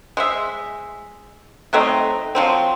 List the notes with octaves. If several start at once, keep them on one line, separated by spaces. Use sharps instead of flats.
G#3 C5 E5
F#3 A3 C4 D#4
F3 F#3 C4